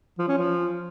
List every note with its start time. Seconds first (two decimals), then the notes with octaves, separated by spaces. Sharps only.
0.18 F3
0.28 C#4
0.38 F3